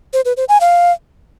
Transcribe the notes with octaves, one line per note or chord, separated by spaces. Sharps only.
C5
B4
C5
G#5
F5